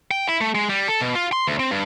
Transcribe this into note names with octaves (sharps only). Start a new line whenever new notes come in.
G5
E4
A3
G#3
G3
A4
B2
F4
C6
D2
C4
G2